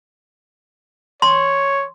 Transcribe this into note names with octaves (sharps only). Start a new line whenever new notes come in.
C#5 C6